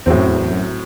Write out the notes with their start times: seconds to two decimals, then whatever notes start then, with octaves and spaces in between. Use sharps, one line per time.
0.06 E2 A2 F#3 C4
0.18 F#2
0.28 E2
0.42 E2
0.52 F#2